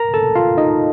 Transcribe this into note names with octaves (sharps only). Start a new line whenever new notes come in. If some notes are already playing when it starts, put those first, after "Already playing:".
Already playing: A#4 A#5
A4 A5
F4 F5
D#4 D#5